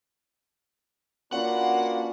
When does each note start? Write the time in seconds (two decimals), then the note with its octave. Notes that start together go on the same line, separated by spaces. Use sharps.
1.33 A#3 C#4 D4 F4 F#4 B4 F#5 C6